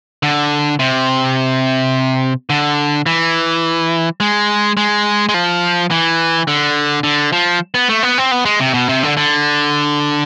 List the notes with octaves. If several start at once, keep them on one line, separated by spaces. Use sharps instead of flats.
D3
C3
D3
E3
G#3
G#3
G#3
F3
E3
D3
D3
F3
B3
A3
B3
C4
B3
G#3
C3
B2
C3
D3
D3